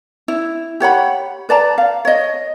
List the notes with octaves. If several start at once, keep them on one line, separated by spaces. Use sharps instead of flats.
E4
G4 C#5 F#5 B5
B4 D5 A5 A#5
F5
C#5 D#5